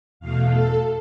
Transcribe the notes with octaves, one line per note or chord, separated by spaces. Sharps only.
E2 B2 A3 F5
A4